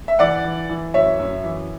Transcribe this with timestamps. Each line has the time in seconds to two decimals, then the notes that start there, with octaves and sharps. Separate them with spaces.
0.08 E5
0.19 E3 D5 F#5
0.44 E3
0.69 E3
0.94 F#2 C#5 E5
1.19 F#2
1.44 E3